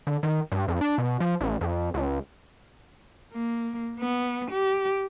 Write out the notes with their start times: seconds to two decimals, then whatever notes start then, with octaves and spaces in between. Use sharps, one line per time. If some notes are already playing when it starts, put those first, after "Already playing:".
0.07 D3
0.23 D#3
0.52 G2
0.68 F2
0.81 D4
0.98 B2
1.20 F3
1.41 A1
1.61 F2
1.94 C#2
3.33 A#3
4.00 B3
4.51 G4